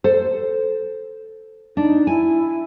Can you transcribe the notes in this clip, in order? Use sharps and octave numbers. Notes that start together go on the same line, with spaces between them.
A4 C5
D4 D#4
E4 G#5